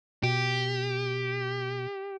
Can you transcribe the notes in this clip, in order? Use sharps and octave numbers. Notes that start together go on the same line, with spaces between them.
B2 G4